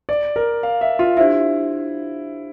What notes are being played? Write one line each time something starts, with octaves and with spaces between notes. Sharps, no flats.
D5
A#4
F5
E5
F4
D4 E4 G4 C5 E5